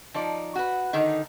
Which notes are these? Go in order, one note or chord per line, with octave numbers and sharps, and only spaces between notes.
F3 D#4 D5
F#4 B4
D3 D#3 D#4